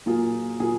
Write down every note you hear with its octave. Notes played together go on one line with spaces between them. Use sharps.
A#2 F#3 A#3 F4 G#4
A#2 F#3 A#3 F4 G#4